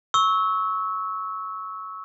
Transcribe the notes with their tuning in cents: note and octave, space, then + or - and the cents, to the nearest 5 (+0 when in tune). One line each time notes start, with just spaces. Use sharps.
C#6 +0 E6 -20